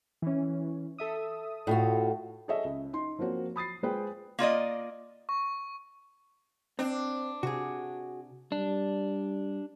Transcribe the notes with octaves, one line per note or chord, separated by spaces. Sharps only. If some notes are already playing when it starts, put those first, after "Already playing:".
E3 C#4
A4 E5 D#6
A2 F4 F#4
G#4 A4 C#5 D#5 E5
C#2
D#4 C6
F3 A#3 C4 F#4 C#5
B5 D#6 A6 C7
G#3 F4 G#4 B4 C5 G5
A#3 F4 D5 D#5
C#6
C4 D4
C3 F#4 G#4
G3 D4